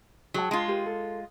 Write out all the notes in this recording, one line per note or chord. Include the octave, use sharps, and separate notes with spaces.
F#3 G#4 G5 A5
G#3 F4
G4 A#4
A4